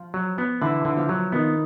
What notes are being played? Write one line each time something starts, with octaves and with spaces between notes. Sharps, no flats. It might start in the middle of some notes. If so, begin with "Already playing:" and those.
Already playing: F3 F4
F#3
B3
D3 E3 E4
D3
F3 F4
F#3
D#3 B3 D#4